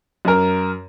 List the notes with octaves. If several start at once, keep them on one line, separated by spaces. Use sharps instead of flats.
F#2 A#4